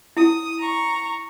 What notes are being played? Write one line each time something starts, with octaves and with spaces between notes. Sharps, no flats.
E4 D#6
A#5 C#6